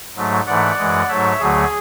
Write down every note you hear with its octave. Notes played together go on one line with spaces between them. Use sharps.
G#2 F#3 A3
G#2 E3 A3 D5 F#5
F#2 E3 G#3
G#2 F#3 A3 C#5 E5
D2 D3 F#3 A3 G#4